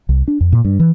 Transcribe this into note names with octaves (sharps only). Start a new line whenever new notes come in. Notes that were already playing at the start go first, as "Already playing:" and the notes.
C2
D4
F2
A#2
G2
E3